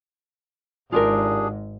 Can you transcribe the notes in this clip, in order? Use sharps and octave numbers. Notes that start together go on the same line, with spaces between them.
G#1 G#2 D4 F4 G4 G#4 A#4